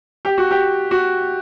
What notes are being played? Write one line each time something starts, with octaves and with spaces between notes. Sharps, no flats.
G4
F#4
G4
F#4